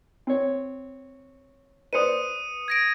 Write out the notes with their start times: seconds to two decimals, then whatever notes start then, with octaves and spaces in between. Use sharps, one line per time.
0.27 C4 C#5
1.93 B4 C5 D5 D#6 C#7 D#7
2.68 G#6 A#6 D7